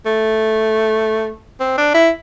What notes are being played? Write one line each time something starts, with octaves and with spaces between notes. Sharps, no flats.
A3
C4
D4
E4